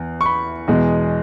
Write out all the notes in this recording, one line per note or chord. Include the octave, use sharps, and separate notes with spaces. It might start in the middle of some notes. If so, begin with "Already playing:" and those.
Already playing: E2
C#6
B5
E2 B2 G#3